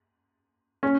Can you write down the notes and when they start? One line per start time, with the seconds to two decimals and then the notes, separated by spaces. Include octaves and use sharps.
0.83 C#4